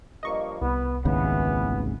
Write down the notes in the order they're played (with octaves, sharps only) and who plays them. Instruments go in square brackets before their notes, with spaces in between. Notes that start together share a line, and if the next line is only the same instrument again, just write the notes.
[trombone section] G2 F3 A#3 [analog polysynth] D#5 C#6
[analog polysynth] C2 [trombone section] B3
[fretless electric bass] G#1 D#2 C#3 [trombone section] E3 B3